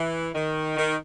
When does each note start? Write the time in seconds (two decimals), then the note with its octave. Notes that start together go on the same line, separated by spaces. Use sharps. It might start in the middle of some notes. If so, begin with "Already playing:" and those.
Already playing: E3
0.35 D#3
0.77 D#3